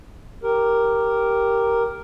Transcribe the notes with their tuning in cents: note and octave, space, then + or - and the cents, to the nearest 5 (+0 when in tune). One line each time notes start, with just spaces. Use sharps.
G4 +0 A#4 +0